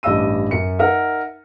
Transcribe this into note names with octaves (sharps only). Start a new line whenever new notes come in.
A1 G2 D#5 E5 E6 D#7
F#2 C#7
D#4 A#4 E5 F#5